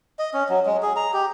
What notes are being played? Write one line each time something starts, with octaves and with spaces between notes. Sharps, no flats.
D#5
C#4
F#3
G#3
G#4
A#5
G4